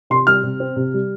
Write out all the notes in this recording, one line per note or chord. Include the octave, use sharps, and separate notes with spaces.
C3 C6
G3 F6
C3
C4
C3
G3